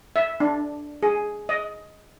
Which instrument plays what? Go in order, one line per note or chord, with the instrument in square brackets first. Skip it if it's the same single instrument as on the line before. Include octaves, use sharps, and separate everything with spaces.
[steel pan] E5
D4
G#4
D#5